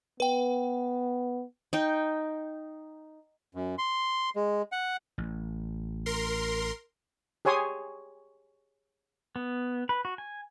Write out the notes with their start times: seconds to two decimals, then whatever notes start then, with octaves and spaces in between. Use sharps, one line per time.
0.20 B3 B4 G5
1.73 D#4 G5
3.55 F#2
3.78 C6
4.36 G#3
4.72 F#5
5.18 A1
6.06 A#4 C6
7.45 G4 G#4 C#5 G#5 C6 D#6
9.36 B3
9.89 B4
10.05 F#4
10.18 G#5